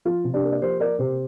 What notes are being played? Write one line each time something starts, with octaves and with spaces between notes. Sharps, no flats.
F3 F4
C3
D4 G4
A#3
D5
F3 G4 C5
A#3 A#4 D5
C3 G4 C5